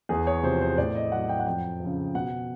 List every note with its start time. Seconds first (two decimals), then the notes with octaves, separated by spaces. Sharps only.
0.09 E2 G#4
0.27 C#5
0.43 C3 F3 C5
0.61 C5
0.78 A2 D5
0.95 D#5
1.12 F#3 F#5
1.29 G5
1.39 F#5
1.46 F2 G5
1.80 C#3 F3
2.14 B2 F#5